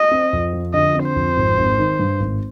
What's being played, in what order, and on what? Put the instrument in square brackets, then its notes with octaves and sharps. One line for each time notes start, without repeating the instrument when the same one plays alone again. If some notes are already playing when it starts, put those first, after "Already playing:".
Already playing: [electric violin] D#5
[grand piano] C4
F2
F3
[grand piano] D3 [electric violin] D#5
[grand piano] C4
[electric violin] C5
[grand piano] F2
G#1
G#1
D#3
G2
G#1